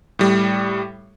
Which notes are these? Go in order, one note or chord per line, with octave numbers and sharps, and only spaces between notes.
A2 G3